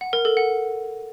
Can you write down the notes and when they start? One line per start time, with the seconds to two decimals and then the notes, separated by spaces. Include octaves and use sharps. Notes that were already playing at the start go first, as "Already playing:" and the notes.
0.01 F#5
0.13 A#4
0.25 A4
0.37 F#5